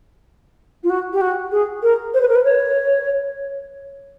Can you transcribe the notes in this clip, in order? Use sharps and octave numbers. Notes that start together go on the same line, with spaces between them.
F4
F#4
G4
F#4
G#4
A#4
C5
B4
A#4
B4
C#5